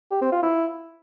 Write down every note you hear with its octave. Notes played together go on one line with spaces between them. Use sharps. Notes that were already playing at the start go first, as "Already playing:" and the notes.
G4
C4
F4
E4